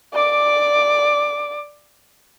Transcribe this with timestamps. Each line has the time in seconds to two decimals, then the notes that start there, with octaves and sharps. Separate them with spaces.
0.13 D5 D6